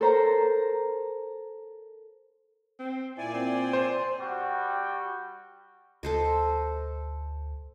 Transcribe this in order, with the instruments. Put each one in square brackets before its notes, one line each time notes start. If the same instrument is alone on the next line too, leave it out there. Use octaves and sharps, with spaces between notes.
[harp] A4 A#4 C5 A#5
[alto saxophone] C4
[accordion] A#2 D5 G#5 [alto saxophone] E4
[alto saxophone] C4
[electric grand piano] C5
[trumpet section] G3 F#4 G5
[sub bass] D2 [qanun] A4 C5 D#5